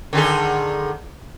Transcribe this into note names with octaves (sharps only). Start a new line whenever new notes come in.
D3 D#3 G#4